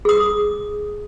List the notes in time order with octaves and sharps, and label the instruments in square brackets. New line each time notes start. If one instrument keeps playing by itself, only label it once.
[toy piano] G#4 D#6